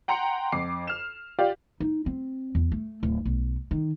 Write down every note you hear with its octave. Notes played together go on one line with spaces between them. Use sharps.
F#5 G5 A#5 C6 C#7
F2 D6 C7
F6 E7
F4 G4 D5 F5
D#4
C4
E2
A3
D1
B1
D#3